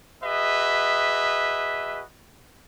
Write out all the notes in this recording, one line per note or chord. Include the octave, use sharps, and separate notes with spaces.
F#4 G#4 B4 D#5 E5